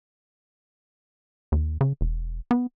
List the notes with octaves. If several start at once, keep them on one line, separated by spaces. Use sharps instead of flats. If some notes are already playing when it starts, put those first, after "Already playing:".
D#2
C#3
E1
B3